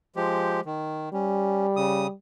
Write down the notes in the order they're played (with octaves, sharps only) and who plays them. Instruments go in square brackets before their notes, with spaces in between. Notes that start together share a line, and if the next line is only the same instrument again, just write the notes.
[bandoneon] F3 G#3 G4
D#3
[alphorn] G3 [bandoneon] C#4
[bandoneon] C#3 D#6